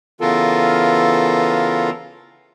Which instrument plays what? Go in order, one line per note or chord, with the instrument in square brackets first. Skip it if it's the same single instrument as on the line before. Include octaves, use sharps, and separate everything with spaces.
[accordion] C#3 E3 B3 F4 A4 A#4